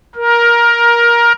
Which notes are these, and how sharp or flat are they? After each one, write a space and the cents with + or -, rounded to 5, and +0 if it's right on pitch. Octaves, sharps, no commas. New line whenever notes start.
A#4 +15